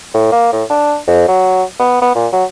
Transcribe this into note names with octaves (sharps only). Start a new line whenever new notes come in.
A2
A#3
A2
D4
F2
F#3
B3
B3
A#2
F#3